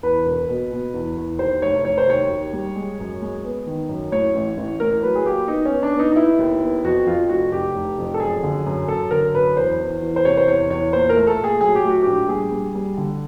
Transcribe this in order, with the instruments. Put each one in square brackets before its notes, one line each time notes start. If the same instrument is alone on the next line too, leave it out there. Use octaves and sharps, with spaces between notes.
[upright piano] E2 B4
E1
B2
B2
E2
E2
D#2 C5
F1 C#5
F1 C#5
C5
D#2 C#5
D#2
G3
G#3
F#2
G#3
B3
D#3
F#2
A2 C#5
A1
A1
A2 A#4
F#3 B4
G#4
A#3 G4
B3 D#4
B3 C#4
D4
B3
D#4
D#4
B3 E4
D#2
B3
F2 F#4
F2 F4
F1 F#4
F1 G4
F1
F2
A4
F#2 G#4
D3
F#2
F#2 A4
D3 A#4
F#2 B4
E2 C5
E2
E3
C5
C3 C#5
C5
E2 C#5
E2 C#5
A#2 C5
A#4
A3
A4
A#2
G#4
F#3 G#4
G4
A3 F#4
A#1 G4
G3 G#4
G3
G3
D3